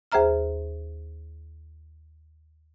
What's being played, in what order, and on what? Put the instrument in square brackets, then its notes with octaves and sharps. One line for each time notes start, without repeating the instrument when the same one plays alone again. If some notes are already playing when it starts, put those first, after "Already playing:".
[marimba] D#2 G#4 C5 E5 A#5 F6